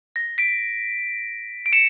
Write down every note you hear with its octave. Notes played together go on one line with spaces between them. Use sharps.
A#6
B6 D7
D7
C#7 E7